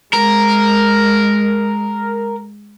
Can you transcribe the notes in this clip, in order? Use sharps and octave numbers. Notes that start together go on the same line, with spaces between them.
G#3 A#4